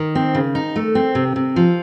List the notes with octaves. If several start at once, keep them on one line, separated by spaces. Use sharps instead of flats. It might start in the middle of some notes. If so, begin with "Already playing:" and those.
Already playing: D#3
C4
C#3
D#4
A3
C4
C3
C3
F3